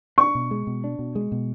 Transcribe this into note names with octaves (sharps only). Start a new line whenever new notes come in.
D4 C#6
B2
G#3
B2
D4
B2
G#3
B2